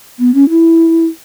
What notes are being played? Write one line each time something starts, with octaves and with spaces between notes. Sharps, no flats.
B3
C#4
E4